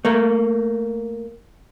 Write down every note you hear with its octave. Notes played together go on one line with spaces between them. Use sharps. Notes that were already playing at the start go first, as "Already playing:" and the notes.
A3 A#3